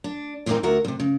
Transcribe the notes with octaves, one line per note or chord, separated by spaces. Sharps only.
D4
A#2 E3 F3 A#3 C4 D#4
D2 F#4 A#4 E5
D2 C3
C#3